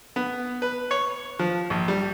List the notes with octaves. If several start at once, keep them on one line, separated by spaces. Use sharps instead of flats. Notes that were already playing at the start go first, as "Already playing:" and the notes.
B3
B4
C#5
F3
A#1
G3